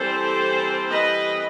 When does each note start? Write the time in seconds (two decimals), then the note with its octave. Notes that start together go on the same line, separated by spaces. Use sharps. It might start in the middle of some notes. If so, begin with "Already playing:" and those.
Already playing: E3 G3 C4 A4 C5
0.90 B4 D#5